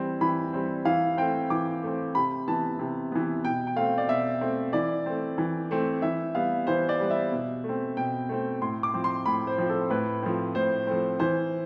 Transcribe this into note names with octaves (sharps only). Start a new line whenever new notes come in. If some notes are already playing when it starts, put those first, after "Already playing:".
Already playing: E3 G3 C4
E3 B5
G3 C4
E3 F5
A3 C4 G5
E3 D6
A3 C4
C3 B5
E3 B3 A5
C3
E3 B3
B2 G5
G5
A3 C4 F5
D5
B2 E5
A3 C4
E3 D5
A3 C4
E3
A3 C4
E3 E5
G3 B3 F5
E3 C5
D5
G3 B3
E5
B2
A3
C4
B2 G5
A3 C4
A2 C6
D6
F3 C4
C6
A2 B5
C5
F3 C4
A4
A2 B4
F3 A3 C4
A2 C5
F3 A3 C4
E3 C5